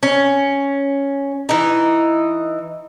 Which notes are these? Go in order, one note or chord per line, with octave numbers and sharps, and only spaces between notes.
C#4
E3 D#4